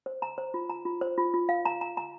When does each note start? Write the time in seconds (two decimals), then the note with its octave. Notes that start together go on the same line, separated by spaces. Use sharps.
0.06 C5
0.22 A#5
0.38 C5
0.54 F4
0.70 A#5
0.85 F4
1.01 C5
1.18 F4
1.34 F4
1.49 F5
1.65 A#5
1.81 A#5
1.97 A#5